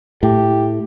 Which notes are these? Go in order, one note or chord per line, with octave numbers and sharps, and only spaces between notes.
A2 G4